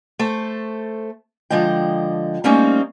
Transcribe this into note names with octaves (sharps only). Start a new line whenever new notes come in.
A3 A4 C5
D3 F3 G#3 D#5 G5
G3 A3 A#3 C4 C#4 D#4